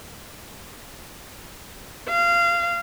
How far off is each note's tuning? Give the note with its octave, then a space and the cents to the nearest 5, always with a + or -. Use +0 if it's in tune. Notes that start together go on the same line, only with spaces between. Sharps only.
F5 -20